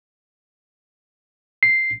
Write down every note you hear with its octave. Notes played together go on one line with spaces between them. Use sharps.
C7